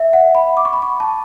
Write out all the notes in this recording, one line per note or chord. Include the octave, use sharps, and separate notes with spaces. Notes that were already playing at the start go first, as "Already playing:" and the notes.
Already playing: E5
F#5
B5
D6
C#6
B5
C#6
A5